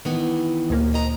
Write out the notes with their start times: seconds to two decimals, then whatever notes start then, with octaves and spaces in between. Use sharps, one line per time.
0.05 D#3 E3 B3
0.70 D2 A#2 A#3
0.93 F2 D#5 A#5